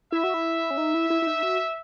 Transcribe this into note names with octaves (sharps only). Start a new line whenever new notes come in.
E4 E5
F#4
E4
C#4
D#4
E4
E4
E4
D#4
F#4